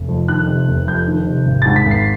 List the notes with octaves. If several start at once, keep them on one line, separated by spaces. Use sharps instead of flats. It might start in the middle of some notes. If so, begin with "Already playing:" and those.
Already playing: F1
F2
D#3 F#6
C3
F1
F2 G6
D#3
C3
G#1
G#2 A6
B6
G#1
C7